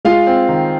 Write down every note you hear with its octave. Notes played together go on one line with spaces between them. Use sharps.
G#3 F4 F5
C4
D#3